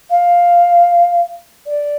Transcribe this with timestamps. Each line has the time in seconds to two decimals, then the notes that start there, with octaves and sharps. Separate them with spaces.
0.10 F5
1.66 D5